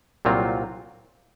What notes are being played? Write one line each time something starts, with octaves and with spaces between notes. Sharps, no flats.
C2 A#2 F#3 C4 F4